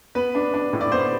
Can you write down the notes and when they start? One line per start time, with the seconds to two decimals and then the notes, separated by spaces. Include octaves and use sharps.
0.15 B3 B4
0.35 D4
0.54 D4
0.73 A2
0.81 D5
0.92 B3 C5